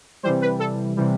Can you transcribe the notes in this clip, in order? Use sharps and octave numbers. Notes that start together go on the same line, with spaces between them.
C3 E3 G3 C5
B4
A4
C3 E3 G3